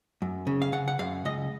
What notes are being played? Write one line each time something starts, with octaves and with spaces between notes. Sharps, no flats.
F#2
C#3
F5
C#3 F#5
F#5
F#2 F5
C#2 D#5